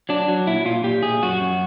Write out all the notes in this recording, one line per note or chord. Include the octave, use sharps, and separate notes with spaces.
F#3 D4
F#3
A#2 E4
A#2 F4
A#2 G4
A#2 G#4
F#2 F#4
F#2